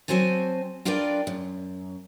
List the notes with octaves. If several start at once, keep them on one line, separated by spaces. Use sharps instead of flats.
F#3 C4 F#4 C5 G#5 A5
D4 F4 A#4 B4 D5 G5
F#2